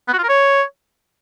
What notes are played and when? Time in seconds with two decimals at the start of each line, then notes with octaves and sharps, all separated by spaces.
0.08 B3
0.13 F#4
0.18 F4
0.24 A#4
0.29 C#5